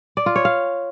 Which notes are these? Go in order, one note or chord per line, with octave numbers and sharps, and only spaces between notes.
D5
F4
C#5
F5